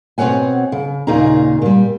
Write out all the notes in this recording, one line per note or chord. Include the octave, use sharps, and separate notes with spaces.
B2 C4 A4 C#5 F#5 G#5
C#3
D#2 A#2 C#3 D#4 G#4 A#5
A#2 G3